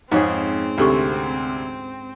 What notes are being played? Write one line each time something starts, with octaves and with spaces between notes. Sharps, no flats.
F2 G#2 C4 C#4 G#4
D2 C3 G4 A4 C#6